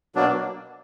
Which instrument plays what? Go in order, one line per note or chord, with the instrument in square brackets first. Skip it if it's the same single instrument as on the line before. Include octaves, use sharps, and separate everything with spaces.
[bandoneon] B2 F#3 A#3 D4